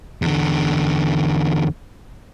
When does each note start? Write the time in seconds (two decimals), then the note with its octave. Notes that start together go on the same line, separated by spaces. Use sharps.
0.22 E2 D3